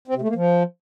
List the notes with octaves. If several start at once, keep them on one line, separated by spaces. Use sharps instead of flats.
C4
C3
A3
A#3
F3